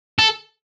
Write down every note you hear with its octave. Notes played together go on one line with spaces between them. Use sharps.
A4